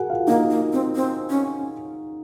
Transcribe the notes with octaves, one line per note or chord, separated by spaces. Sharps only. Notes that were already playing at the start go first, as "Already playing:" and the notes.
Already playing: F#4 G#4 A#4 F#5 G#5
F4 F5
A#3 D#4 D#5
A#3
C4
C4
C#4